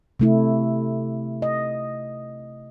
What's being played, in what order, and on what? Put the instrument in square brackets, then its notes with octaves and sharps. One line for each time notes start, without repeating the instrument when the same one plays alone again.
[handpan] C3 A3 E4
D#5